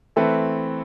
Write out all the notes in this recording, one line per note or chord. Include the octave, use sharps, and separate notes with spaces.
E3 A3 C4 A4 B4